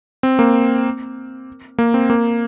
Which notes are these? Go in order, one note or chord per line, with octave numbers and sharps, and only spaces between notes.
C4
A#3
A#3
C4
A#3